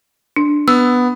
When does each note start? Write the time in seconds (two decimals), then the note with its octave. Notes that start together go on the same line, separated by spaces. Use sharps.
0.36 D4
0.68 B3 E6